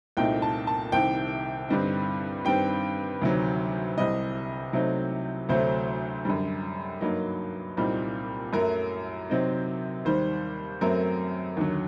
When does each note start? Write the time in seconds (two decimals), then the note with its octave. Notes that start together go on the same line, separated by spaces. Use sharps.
0.17 C2 A#2 A3 C4 D#4 G5
0.42 A5
0.67 A5
0.92 C2 C3 D#3 G5
1.69 G2 D3 G3 C4 D#4
2.45 G2 D#3 G3 C4 G5
3.22 D2 C3 D#3 F#3
3.97 C2 C3 G3 D#5
4.73 C3 F#3 A3 C4 D#4
5.49 D2 C3 F#3 A3 C5
6.25 F#2 D3 G3
7.01 G2 F#3 A#3 D#4
7.77 C2 A#2 G3 C4 D#4
8.53 F#2 F#3 A3 A#4
9.30 C3 F#3 C4 D#4
10.05 D#2 D#3 G3 C5
10.81 F#2 F#3 A3 C4 A#4
11.57 D#2 D3 F#3